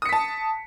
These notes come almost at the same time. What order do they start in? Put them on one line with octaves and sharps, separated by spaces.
D#6 C#7 B6 A5